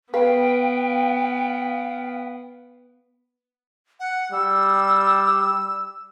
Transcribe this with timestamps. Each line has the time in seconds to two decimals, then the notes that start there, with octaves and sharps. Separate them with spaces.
0.14 B3 B4 F5 G5
4.00 F#5
4.32 G3 E6